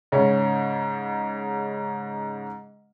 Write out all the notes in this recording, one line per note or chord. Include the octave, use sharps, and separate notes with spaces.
G#2 C#3 C#4